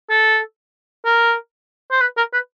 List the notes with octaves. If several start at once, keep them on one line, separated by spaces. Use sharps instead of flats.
A4
A#4
C5
B4
A#4
B4